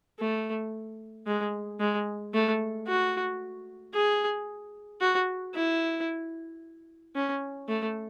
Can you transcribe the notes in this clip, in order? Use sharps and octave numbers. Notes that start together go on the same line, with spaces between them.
A3
G#3
G#3
A3
F#4
G#4
F#4
E4
C#4
A3